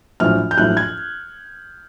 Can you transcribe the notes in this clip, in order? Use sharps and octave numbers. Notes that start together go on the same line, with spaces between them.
A#1 A2 F#3 F6
G6
A#1 A2 F#3 F#6
G#6